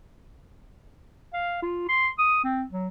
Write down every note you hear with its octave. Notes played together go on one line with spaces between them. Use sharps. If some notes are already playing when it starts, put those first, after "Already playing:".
F5
F4
C6
D#6
C4
F#3